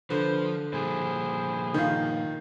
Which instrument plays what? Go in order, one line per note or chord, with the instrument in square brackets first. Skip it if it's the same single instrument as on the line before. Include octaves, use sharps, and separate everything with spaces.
[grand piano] D3 [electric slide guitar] F3 [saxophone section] B4 C5
[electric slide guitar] A#2 F3 G3 [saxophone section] E4 G#4 C5
[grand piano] D#3 F4